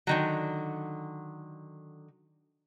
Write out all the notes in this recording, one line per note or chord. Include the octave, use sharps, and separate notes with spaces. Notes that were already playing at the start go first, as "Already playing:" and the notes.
D3 D#3 F#3